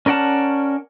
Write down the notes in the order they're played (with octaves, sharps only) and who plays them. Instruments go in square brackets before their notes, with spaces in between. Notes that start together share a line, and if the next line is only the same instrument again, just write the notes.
[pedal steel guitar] C#4 A#4 D5 F#5 A5